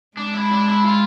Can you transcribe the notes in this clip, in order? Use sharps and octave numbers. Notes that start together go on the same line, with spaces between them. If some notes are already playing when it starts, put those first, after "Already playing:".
G#3 D4
E4
D4
E4
F4